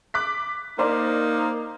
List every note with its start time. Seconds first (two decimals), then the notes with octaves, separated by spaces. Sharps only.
0.14 D6 F#6 B6
0.79 A#3 D#4 A#4 C5 D5